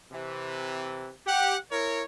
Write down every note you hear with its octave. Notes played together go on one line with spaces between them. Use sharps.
C3 E3
G4 F#5
E4 A#4 C#5